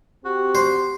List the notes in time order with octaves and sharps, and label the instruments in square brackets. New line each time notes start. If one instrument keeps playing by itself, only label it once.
[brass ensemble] C4 G4 [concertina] F#4
[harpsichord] C5